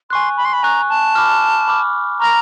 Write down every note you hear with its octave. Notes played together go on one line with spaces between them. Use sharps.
G#5 C6 C#6 F#6
B5
C6
B5
G#5 A#5 C#6 F#6
A5
B5 D6 F6
B5 D6 F6
A#5 C#6 F6 A#6